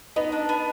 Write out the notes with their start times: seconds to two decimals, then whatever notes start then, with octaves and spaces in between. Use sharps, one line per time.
0.16 B3 D#4 D#5
0.32 D4
0.49 B3